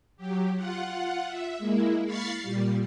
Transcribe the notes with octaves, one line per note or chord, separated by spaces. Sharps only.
F#3 G4
F4 F#5
E5
G#3 A#3 E4
F5 B5 C#6 A6 C7
A#2 G3